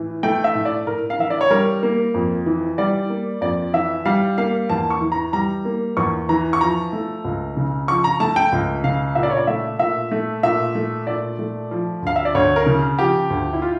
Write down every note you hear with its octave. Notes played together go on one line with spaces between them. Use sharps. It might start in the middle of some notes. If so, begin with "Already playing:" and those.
Already playing: A2 E3
A3 G5
E5
A2
D5
A2 A#4
F5
E3 E5
D5
C#5
G3 A#4
A#3
F2
E3
G3 D5
A#3
F2 D5
E3 E5
G3 F5
A#3 F5
E2 A5
C#6
E3
A#5
G3 A#5
A#3
E2 C#6
E3 A#5
C#6
F3 A#5
A3
C#2
C#3
F3 C#6
A#5
A3 A5
G5
C#2
C#3 F5
A#2 E5
D5
C#5
D5
A3 E5
A#2 E5
A3
A#2 E5
A3
A#2 D5
A3
F3
D2 F5
E5
D5
D2 C#5
A#4
C#3
F3 G4
D2
E4
F4